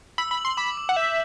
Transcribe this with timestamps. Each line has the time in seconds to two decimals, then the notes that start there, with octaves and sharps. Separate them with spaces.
0.18 B5 E6
0.31 B5
0.37 F#7
0.45 C6
0.57 B5 D6
0.77 D6
0.89 F#5
0.96 E5 G6